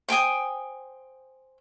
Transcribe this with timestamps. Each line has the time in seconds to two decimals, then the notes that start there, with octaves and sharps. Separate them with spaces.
0.08 C5 G5 G#5 D#6